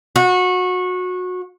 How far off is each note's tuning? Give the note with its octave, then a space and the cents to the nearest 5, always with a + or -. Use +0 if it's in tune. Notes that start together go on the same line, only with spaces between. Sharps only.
F#4 -25